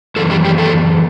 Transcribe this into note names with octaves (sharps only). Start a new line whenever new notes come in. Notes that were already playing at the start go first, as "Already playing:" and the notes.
F#2 E3 A4
G3 G4
G3 G4
A3 A4